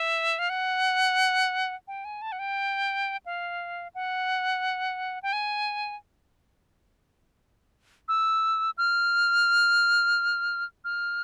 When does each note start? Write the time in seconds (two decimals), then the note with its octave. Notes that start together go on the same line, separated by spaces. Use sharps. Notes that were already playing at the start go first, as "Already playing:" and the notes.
Already playing: E5
0.39 F5
0.49 F#5
1.88 G5
2.05 G#5
2.22 A5
2.32 F#5
2.39 G5
3.26 F5
3.95 F#5
5.23 G5
5.33 G#5
8.08 E6
8.78 F6
10.85 F6